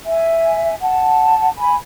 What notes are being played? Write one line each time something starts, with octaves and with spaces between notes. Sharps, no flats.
E5 G#5
F#5 A5
G#5 B5